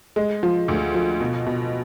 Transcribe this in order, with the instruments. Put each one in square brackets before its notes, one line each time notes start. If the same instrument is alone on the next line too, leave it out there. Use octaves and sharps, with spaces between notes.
[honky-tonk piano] G#3
F3
D2
F3
B2
B2